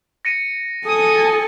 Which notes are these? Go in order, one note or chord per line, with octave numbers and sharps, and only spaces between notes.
A#6 C#7 D#7
A4 G#5 D#6